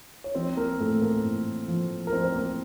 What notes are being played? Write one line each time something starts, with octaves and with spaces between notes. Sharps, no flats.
C#5
F3 C4 C5
A#3 A#4
A2 A3 A4
A#3 A#4
A2
F3
A#4
F3 C4 C5
C5
A#3 A#4